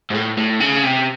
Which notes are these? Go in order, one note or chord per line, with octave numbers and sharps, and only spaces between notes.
G#2
A2
A2
C#3
C3